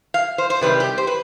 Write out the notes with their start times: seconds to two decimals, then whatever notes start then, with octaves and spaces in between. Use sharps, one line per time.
0.14 F5
0.38 C5
0.50 C5
0.61 C3 D#3 G3 C4 B4
0.80 G4
0.98 C5
1.07 B4